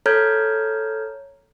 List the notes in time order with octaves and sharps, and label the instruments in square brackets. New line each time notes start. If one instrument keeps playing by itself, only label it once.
[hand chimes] A4 C#5 A#5 F6 G6 G#6